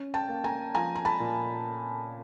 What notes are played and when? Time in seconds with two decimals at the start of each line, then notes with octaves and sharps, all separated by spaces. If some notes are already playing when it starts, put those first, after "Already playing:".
Already playing: C#4
0.14 G5 A5
0.29 A#3
0.44 G#5 A#5
0.74 F3 G#5 A#5
0.96 A#5
1.05 A5 B5
1.20 A#2